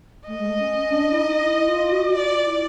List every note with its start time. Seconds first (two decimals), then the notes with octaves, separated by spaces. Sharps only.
0.27 A3 D#5
0.38 G#3
0.48 A3
0.59 C#4
0.81 C#4
0.90 D4
1.11 E4
1.21 D#4
1.44 E4
1.68 F4
1.92 F#4
2.06 F#4
2.14 F4 D5
2.46 E4